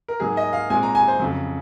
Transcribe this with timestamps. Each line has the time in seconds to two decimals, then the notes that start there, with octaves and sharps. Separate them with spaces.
0.08 A#4
0.20 G#2 F#3 A#3 G#4
0.37 D#5
0.53 F5
0.70 A#2 G#3 C4 G#5
0.83 A#5
0.95 G#5
1.08 C5
1.20 F2 C#3 F#3